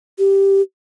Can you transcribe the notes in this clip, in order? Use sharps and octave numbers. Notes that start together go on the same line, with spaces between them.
G4